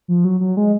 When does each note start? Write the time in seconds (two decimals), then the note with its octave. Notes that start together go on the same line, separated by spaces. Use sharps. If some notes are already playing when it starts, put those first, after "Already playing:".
0.08 F3
0.25 F#3
0.41 F#3
0.57 G#3